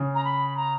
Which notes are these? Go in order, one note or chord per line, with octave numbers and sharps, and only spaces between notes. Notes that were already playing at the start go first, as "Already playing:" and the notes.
Already playing: C#3
A#5
B5
A#5